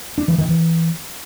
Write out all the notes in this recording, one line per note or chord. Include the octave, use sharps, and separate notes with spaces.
D4
E3
D#3
E3